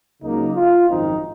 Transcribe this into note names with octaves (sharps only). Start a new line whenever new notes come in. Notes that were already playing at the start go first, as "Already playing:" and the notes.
C#2 C#3 F#3 A#3 D#4
F4
G#1 F#2 F3 C4 D#4